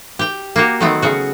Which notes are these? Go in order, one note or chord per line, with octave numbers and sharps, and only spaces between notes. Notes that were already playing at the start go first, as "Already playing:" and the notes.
G4 G5
A#3 F#4 G4
D#3 F#3 A3 B3 C4
C#3 F#4